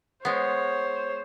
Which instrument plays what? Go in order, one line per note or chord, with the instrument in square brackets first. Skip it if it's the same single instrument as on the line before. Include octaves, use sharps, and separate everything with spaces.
[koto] G#3 B3 [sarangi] C5 [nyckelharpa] C#5